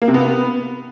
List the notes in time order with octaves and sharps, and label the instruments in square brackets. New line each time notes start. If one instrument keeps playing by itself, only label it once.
[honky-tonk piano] A#3
C3
B3